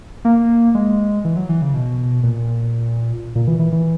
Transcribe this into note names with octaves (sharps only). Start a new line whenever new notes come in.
A#3
G#3
E3
F#3
E3
C#3
B2
A#2
A#2
E3
E3
E3